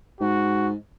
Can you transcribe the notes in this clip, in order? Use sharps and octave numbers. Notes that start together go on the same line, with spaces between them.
G#2 F#4